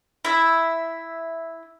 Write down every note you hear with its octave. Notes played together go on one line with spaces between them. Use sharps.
E4 E5